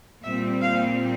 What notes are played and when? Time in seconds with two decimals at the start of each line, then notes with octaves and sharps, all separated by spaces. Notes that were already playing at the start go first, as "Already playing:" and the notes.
0.23 A#2 G3 C4 E5
0.60 F5